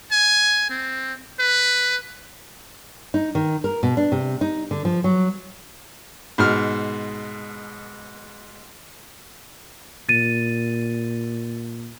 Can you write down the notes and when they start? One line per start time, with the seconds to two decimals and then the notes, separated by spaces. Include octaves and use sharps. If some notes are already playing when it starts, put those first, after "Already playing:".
0.11 G#5
0.70 C4
1.39 B4
3.14 D#4
3.35 D#3
3.64 A#4
3.83 B2
3.97 D4
4.12 C3
4.41 D#4
4.71 D3
4.85 F3
5.04 F#3
6.38 G#2 B2 F6
10.09 A#2 A6 D#7